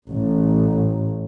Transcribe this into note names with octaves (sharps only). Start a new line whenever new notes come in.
A1